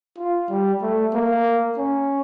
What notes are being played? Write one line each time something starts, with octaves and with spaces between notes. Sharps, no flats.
F4
G3
A3
A#3
C#4